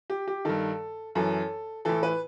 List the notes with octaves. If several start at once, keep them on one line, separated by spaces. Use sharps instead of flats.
G4
G4
G2 D#3 A4
F#2 E3 A4
A2 E3 A4
B4